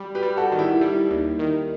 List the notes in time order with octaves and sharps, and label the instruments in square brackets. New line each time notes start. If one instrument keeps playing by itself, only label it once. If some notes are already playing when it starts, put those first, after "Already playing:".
Already playing: [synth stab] G3
[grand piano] G4 B4
[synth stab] G3
[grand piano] F#4 A4
[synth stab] D#3
[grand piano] E4 G4
[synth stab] G3 [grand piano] E4
[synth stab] D#2
D#3